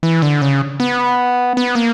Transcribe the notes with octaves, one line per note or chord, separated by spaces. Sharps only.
E3
D3
C#3
B3
B3
A#3